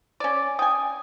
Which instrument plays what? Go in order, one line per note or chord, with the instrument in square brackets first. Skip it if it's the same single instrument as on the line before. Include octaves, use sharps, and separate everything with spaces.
[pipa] C#4 D5
[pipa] G5 G#5 [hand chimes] D#6